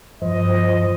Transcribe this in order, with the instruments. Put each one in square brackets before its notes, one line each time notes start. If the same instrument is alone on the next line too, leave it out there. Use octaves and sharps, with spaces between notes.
[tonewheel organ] G2 F3 C5 [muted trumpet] D#5